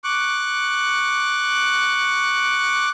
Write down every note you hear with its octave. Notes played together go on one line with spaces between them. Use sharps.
C#6 D6 F#6